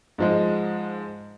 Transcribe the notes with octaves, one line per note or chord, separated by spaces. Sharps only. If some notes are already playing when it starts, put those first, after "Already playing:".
G#2 F3 G#3